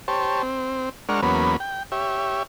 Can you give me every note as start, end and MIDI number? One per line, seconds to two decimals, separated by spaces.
0.08 0.42 67
0.08 0.42 72
0.08 0.42 73
0.08 0.42 81
0.43 0.89 60
1.09 1.21 56
1.09 1.21 62
1.09 1.21 70
1.09 1.21 78
1.09 1.21 85
1.09 1.21 89
1.23 1.56 40
1.23 1.56 54
1.23 1.56 58
1.23 1.56 59
1.23 1.56 61
1.23 1.56 83
1.60 1.83 79
1.92 2.43 67
1.92 2.43 73
1.92 2.43 76